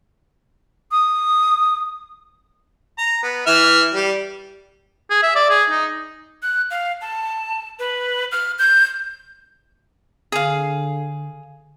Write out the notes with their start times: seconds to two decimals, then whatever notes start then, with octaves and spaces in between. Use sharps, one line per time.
0.92 D#6
2.98 A#5
3.23 B3
3.47 E3 E5 F6
3.94 G3
5.10 G#4
5.23 E5
5.35 D5
5.50 G#4
5.70 D#4
6.43 F#6
6.71 F5
7.01 A5
7.79 B4
8.32 F6
8.59 G6
10.32 D3 G#4 F5